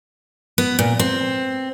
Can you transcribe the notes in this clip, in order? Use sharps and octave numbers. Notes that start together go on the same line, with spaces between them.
B3
A#2
C4